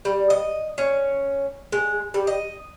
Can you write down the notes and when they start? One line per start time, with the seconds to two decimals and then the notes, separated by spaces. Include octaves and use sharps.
0.05 G3
0.30 D#5
0.78 C#4
1.72 G#3
2.14 G3
2.27 D#5